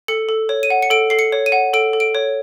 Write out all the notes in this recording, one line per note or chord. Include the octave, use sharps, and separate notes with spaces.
A4 C#7
A4
C#5
D#7
F#5
C#7
A4 D7
A4 C7
C#7
C#5
D#7
F#5
A4 D7
A4
D7
C#5